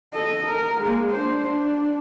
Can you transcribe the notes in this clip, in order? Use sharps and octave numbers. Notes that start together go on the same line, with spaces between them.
A4 D#5
A#4
G#3 A#3
D4 C5
D4